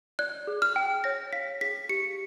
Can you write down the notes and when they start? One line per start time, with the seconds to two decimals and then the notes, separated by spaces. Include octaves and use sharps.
0.19 D5 F#6
0.47 G#4
0.62 F6
0.76 G5
1.04 C#5 A#6
1.33 F5 B6
1.61 G#4 B6
1.89 G4 C#7